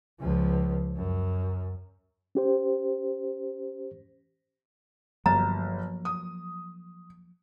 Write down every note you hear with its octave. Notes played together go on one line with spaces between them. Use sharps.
C#2 F3
F#2
C#4 G4 C5
G1 F3 F#3 A#3 A#5 A6
D#6